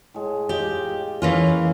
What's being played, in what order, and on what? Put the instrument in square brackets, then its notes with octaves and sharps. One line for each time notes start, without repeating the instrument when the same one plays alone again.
[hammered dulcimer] A2 G#3
[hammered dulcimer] F4 D#5 [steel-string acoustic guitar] G4
[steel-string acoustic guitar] E3 A#3 F4 [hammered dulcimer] C#4